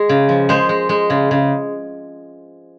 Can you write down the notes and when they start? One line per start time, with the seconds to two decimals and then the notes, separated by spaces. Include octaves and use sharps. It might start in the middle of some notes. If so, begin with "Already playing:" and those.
Already playing: G#3 G#4
0.09 C#3
0.29 F3
0.49 G#3 C5
0.69 G#3
0.89 G#3
1.10 C#3
1.31 C#3